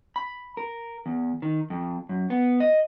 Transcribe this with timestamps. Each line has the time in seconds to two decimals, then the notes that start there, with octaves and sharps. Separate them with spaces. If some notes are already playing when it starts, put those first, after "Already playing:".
0.16 B5
0.57 A#4
1.06 E2
1.42 D#3
1.70 F2
2.09 F#2
2.30 B3
2.60 D#5